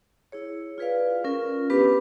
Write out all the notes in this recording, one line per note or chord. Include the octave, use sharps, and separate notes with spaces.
E4 G#4 C#5
F4 G#4 B4 D5 F5
C#4 F4 A#4
B3 D4 G4 B4